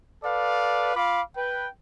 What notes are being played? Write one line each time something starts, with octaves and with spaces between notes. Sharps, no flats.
A4 B4 D5 F5
F4 F5 B5 D6
B4 G5